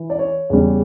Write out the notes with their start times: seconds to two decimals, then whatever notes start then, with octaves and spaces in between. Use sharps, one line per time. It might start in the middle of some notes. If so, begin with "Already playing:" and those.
Already playing: E3
0.10 D5
0.19 C#5
0.50 E2 C#3 G3